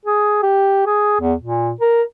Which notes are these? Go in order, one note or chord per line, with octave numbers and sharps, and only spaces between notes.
G#4
G4
G#4
E2
A#2
A#4